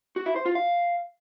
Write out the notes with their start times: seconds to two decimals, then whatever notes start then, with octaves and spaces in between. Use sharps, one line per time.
0.16 F#4
0.26 E4
0.36 C5
0.46 F4
0.55 F5